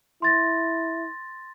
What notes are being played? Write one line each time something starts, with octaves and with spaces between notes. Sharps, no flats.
E4 C6 A6 A#6